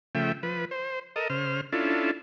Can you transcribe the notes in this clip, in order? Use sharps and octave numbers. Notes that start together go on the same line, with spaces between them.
C#3 F3 A3 E5 G5
F3 B4
C5
A4 A#4 D#5
C#3 C5 F6
C#4 D4 E4 F4 A4